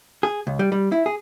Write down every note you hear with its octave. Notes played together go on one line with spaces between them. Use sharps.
G#4
C#2
G3
G3
E4
G#4